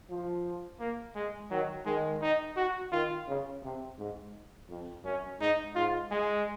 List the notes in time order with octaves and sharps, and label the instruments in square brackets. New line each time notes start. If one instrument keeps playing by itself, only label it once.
[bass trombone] F3
[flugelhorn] A#3
G#3
[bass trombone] D#3 [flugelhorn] F#3
[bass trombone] D#3 [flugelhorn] G#3
[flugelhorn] D#4
F#4
[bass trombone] D#3 [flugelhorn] F4
[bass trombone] C#3
C3
G#2
F2
[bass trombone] F#2 [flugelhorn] C#4
[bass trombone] G#2 [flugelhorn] D#4
[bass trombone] G#2 [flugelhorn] F4
[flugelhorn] G#3